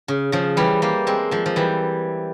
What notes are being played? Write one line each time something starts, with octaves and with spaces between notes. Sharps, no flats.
C#3
C#3 F3
E3 G3
G3 A#3
G#3 C4
F3 G#3
F3
E3 G3